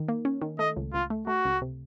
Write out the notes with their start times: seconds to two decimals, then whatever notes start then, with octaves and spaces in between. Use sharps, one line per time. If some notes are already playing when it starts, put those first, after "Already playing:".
Already playing: D#3
0.08 A#3
0.25 C#4
0.42 D#3
0.59 A3 D#5
0.76 C#2
0.93 C#2 F4
1.10 A3
1.27 A3 F#4
1.45 C#2
1.62 C3